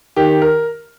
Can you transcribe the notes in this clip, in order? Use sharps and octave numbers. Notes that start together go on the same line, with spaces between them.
D#3 G4
A#4